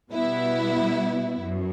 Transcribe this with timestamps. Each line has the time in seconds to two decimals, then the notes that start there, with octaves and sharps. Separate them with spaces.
0.11 B2 G3 B3 E4
1.42 F#2